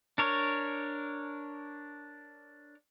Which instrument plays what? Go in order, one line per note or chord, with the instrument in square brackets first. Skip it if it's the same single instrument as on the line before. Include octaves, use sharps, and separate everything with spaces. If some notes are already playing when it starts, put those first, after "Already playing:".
[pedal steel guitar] D4 A#4 C#5